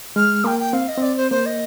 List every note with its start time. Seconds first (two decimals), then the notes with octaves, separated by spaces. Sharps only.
0.16 G#3 F6
0.44 A#3 G5
0.59 G5
0.73 C4 F5
0.88 D#5
0.98 C4 D5
1.17 C5
1.31 A#3 C5
1.46 D#5